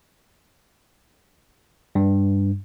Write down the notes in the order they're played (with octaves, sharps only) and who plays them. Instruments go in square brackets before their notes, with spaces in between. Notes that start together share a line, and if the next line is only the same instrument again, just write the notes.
[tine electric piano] G2